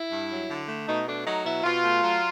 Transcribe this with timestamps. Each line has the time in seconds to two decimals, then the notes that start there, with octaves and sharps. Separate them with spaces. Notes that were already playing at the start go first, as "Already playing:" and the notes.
Already playing: E4
0.10 G2
0.30 F#3
0.49 D3
0.68 A3
0.87 B2 D#4
1.06 A3 D4
1.25 F#3 D#4
1.44 B2 E4
1.64 B2 F4
1.83 A3
2.02 F#3